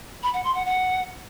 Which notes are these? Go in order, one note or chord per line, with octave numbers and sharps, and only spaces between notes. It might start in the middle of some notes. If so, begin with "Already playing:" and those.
B5
F#5
C6
F#5
F#5